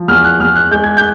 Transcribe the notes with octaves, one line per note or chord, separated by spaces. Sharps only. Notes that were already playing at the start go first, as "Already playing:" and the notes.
Already playing: F3
E2 F6
F#6
E2 F6
F#6
G#3 G6
G#6
G6